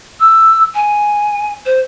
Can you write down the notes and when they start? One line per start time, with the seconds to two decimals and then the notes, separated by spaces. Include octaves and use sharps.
0.20 E6
0.74 G#5
1.65 C5